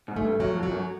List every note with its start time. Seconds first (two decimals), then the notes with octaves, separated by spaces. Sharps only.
0.08 G#2
0.16 A3
0.25 G2
0.40 F#2 F#3
0.55 F2
0.63 F#3
0.71 F#2